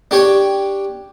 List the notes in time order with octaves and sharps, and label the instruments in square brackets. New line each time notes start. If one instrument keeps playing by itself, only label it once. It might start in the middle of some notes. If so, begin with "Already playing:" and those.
[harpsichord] D4 G4 C#5 G5